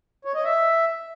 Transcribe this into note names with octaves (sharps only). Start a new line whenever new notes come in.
C#5
D#5
E5